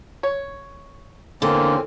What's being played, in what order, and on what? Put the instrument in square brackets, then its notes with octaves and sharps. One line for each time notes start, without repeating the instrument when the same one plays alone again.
[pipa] C#5
[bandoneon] E2 C4 C#4 [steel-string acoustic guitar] D3 [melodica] A#3